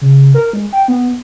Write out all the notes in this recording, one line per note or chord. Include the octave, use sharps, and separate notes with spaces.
C#3
A#4
G#3
G5
B3